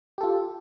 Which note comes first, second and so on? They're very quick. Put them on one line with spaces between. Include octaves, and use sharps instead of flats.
G4 A4 F4